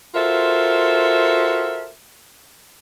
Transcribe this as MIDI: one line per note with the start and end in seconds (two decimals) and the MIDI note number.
0.15 1.90 65
0.15 1.90 66
0.15 1.90 69
0.15 1.90 70
0.15 1.90 72
0.15 1.90 76